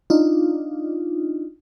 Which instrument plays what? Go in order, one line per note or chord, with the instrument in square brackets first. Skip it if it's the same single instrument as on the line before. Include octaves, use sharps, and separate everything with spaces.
[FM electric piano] D4 D#4 F4